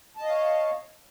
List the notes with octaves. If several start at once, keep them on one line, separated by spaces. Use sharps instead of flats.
C#5 D#5 F5 A5